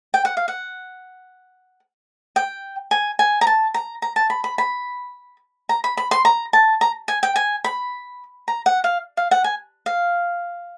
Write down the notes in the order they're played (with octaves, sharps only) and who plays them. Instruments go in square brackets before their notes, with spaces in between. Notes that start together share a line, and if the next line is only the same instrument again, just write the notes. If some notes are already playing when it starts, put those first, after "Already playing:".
[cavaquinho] G5
F#5
F5
F#5
G5
G#5
G#5
A#5
A5
A#5
A#5
A5
B5
B5
B5
A#5
B5
B5
C6
A#5
A5
A#5
G#5
G5
G#5
B5
A#5
F#5
F5
F5
F#5
G#5
F5